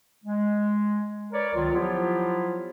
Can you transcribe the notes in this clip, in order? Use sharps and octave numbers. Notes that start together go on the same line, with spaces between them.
G#3
A#4 B4 C#5 D5
C#2 D#3 F#3 F4
F3 F#3 B3 E4 F4 G4